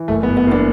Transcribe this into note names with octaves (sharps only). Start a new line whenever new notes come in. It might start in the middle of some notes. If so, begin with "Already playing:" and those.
Already playing: E3
F#1 A3
B3
F#1
B3
F#1 B3 D4